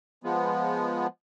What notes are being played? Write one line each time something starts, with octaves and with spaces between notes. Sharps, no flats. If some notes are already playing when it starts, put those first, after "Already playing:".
F3 G#3 B3